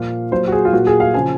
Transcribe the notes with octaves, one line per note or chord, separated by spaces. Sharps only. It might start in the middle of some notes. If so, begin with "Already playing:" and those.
Already playing: A#2 F3 F5
A#2 F#3 C5
F#4
G#4
F4
A#2 F#3 F#4
G#4
F5
C#3 F3 G#5